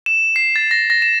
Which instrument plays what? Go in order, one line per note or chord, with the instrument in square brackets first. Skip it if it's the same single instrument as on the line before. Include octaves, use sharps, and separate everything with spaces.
[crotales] E7
C7
A6
A#6
A#6
E7